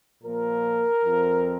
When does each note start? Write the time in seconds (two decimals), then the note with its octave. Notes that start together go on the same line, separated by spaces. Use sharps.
0.23 A#2 F3 A#3 A#4
1.04 F2 F3 C4